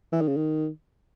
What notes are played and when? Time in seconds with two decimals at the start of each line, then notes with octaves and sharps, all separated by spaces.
0.13 E3
0.21 D#3
0.28 C#3
0.36 D#3